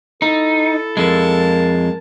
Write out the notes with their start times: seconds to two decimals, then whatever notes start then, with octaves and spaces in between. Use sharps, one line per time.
0.22 D#4 E4 A4
0.97 F2 G#3 A#4 A5